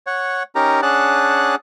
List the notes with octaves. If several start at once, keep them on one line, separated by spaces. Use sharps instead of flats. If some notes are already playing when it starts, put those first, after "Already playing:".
C#5 F#5
C#4 D#4 G4 A#4 A#5
C#4 D4 G#4 F#5 A5 F#6